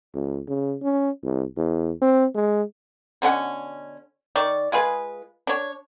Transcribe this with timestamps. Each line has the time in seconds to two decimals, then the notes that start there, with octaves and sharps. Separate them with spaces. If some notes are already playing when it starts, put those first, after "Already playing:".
0.14 C#2
0.47 C#3
0.82 C#4
1.23 C2
1.56 E2
2.01 C4
2.35 G#3
3.22 B2 D3 C#4 F#5
4.36 D#3 D5 C#6
4.72 G#3 F4 G#4 B4
5.47 D4 C#5